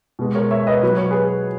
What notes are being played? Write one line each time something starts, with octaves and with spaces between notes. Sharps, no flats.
B2 G#3
A#4 C#5
C#5 E5
B4 D#5
B2 F#3 B4
C#5
G#4 B4